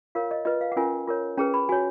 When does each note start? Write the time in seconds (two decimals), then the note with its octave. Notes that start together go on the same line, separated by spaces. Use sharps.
0.15 F4 A#4 C#5 F5
0.31 D#5
0.45 F4 B4 D#5
0.61 F5
0.72 F#5
0.76 C#4 F4 A#4 G#5
1.08 F4 A#4 C#5
1.38 C#4 G#4 B4 A#5
1.54 B5
1.69 F#4 C#5 G#5